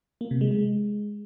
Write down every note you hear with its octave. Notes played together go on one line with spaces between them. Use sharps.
A#3
C3
G#3
G#3